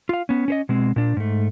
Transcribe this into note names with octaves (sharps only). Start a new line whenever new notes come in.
F4 F5
B3 C#4
C#4 C5 D#5
B2 G#3 C4
A#2 D4
G#2 A3